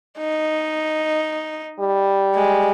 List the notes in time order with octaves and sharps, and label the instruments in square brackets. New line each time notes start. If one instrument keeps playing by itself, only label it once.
[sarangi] D#4
[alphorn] G3
[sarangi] G#3